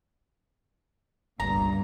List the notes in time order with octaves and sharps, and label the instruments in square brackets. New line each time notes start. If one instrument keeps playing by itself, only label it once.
[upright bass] G1 C#2 [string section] G2 A#2 D3 [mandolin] A#5